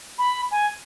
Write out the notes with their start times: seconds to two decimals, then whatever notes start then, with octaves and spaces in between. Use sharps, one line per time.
0.18 B5
0.51 G#5